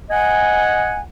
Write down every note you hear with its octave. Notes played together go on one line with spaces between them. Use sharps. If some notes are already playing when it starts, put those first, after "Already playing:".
D#5 F#5 G#5